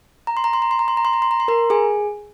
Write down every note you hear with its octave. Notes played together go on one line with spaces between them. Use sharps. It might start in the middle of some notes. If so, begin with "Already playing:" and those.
A#5
C6
A#5
C6
A#5
C6
A#5
C6
A#5
C6
A#5
C6
A#5
C6
A#4 A#5
G#4 G#5